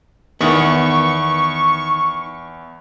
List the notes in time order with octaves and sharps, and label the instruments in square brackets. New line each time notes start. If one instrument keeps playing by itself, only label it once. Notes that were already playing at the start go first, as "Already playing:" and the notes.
[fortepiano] E2 [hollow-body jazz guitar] D#3 B3 [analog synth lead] C#6